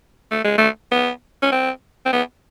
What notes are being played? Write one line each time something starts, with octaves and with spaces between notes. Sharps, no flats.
A3
G#3
A3
B3
C#4
C4
C4
B3